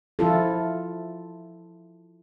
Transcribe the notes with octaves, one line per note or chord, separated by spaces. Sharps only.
F3 E4 F4 A4